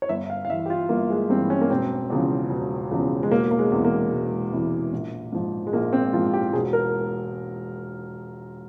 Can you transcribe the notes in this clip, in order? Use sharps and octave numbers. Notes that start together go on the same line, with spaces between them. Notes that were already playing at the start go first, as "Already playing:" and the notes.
C#5
G1 E5
F5
F5
G2 E3 E5
G4
F4
G1 A#3
G#3
G2 E3 C4
C#4
A#3
E1 C4
E2 C#3 F3
E1
E2 C#3 F3
G#3
E1 A#3
A#3
G#3
E2 C3 E3
A#3
E1
E2 C3 E3
A#1
G#2 F3
G#3
A#1 A#3
C4
G#2 F3 F4
G4
E1 G#4
A#4